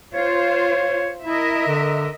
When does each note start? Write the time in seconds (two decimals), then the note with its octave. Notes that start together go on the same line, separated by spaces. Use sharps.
0.14 F4 C5 C#5
1.25 E4 A#4 D#5 E5
1.67 D3